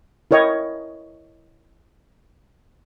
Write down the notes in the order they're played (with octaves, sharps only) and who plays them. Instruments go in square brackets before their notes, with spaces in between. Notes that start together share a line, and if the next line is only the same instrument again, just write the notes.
[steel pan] E4 A#4 C#5 D#5 G5